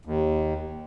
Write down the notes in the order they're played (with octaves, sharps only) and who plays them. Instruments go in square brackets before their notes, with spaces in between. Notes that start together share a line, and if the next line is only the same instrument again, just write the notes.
[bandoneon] D#2